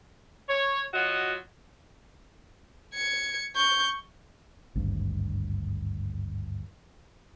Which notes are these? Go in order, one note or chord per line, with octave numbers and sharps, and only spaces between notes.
C#5
F#3 F4 F#4 D#5
G#6 C#7
C#6 G6
G#1 D2 G2